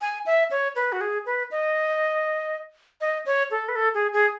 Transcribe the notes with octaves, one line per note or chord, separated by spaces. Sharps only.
G#5
E5
C#5
B4
F#4
G#4
B4
D#5
D#5
C#5
A4
B4
A4
G#4
G#4